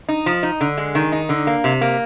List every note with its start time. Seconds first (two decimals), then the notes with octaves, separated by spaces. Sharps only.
0.09 D#4
0.26 F3
0.43 D#4
0.61 D3
0.77 G#3
0.95 D#3
1.12 D#4
1.29 D3
1.47 A#3
1.64 C3
1.81 A#3